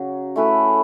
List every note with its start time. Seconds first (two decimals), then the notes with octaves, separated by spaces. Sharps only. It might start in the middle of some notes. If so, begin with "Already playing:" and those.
Already playing: C#3 F#3
0.36 A3 C#4 E4 B4